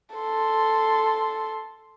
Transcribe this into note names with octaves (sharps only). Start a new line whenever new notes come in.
A4 C6